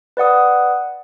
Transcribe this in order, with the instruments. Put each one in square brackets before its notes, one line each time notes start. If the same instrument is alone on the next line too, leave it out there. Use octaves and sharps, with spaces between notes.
[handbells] B4 D5 F#5 D#6